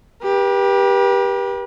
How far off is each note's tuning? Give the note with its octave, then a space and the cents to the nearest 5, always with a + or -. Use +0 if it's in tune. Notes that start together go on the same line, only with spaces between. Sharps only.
G4 +10 B4 -40